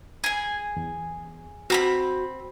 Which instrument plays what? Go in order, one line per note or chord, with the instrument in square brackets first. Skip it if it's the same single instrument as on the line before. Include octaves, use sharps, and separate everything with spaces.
[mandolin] G#4 G#5
[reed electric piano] E2
[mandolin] C4 A#5 B5 [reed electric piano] F#4